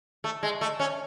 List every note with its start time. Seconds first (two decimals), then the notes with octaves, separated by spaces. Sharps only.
0.24 A3
0.43 G#3
0.61 A3
0.80 C#4